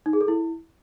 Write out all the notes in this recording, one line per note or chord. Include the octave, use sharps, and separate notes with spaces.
D#4
G#4
A4
E4